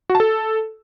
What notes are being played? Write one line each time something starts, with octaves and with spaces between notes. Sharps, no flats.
F#4
A5
A4